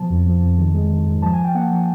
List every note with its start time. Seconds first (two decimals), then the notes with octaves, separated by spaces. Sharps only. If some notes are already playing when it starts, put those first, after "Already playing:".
Already playing: B2 F3 A5
0.10 F2
0.26 F3
0.42 F2
0.58 D#3
0.74 G#3
0.90 D#3
1.07 G#2
1.22 F3 A5
1.33 G#5
1.39 F3
1.44 G5
1.55 A#3 F#5
1.71 F3